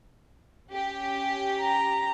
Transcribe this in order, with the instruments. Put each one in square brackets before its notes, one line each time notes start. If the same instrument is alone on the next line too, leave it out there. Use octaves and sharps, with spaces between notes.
[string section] C#4 G4
[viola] A#5